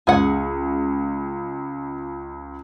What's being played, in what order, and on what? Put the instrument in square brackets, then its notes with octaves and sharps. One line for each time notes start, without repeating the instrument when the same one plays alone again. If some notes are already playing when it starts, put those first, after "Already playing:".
[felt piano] C#2 [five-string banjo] G#4 F#5